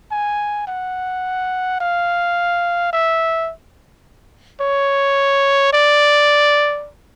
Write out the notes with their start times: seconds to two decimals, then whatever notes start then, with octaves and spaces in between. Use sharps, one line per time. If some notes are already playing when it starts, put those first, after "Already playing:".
0.11 G#5
0.68 F#5
1.81 F5
2.93 E5
4.61 C#5
5.73 D5